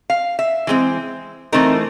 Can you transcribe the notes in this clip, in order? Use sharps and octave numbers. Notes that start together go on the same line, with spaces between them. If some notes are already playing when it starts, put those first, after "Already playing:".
F5
E5
E3 G#3 C4
E3 A3 C4 D#4 A#4